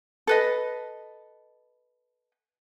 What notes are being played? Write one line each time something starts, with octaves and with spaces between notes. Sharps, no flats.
A4 B4 D#5